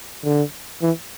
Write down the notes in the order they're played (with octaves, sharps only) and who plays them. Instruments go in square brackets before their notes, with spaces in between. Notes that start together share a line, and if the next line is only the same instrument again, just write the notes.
[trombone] D3
E3